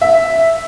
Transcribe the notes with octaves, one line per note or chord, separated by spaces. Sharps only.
E5